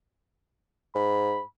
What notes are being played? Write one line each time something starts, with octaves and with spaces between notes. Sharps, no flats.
G#2 B5